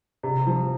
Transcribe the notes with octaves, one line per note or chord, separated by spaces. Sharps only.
C3
F3